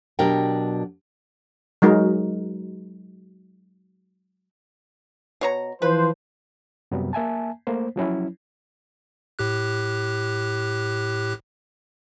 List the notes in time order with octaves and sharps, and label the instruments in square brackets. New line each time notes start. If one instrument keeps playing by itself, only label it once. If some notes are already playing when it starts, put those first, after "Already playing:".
[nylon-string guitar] B2 F#3 D4 G4 A#4 G5
[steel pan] F#3 G#3 D#4 A#4
[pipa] B2 C#5 A#5
[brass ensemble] E3 F3 C5 [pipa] B4
[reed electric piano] F#2 C3 F#3 G3 B3
A#3 E5 G#5 A5
A3 A#3 C5
F3 F#3 C#4 E4
[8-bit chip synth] A2 G4 F#6